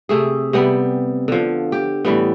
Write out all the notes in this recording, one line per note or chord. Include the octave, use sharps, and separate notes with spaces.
C3 A3 G#4
C3 G3 B3
D3 F3
G4
A2 E3 G3 B3